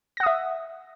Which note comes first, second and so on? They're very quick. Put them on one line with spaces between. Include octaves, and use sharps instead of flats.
A#6 F#5 D#6 E5